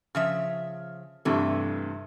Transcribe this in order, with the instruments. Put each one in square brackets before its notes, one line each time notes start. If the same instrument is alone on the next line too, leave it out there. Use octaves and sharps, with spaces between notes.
[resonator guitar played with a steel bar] C#3 F3 E5 [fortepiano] F6
[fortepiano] G2 C3 A4 [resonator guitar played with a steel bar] E3 A3